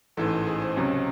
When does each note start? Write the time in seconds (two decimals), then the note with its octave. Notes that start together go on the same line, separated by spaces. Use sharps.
0.17 A1 G#2 E3 A3 A4
0.47 G#4
0.61 C5
0.77 C#2 C3 F#3 C#4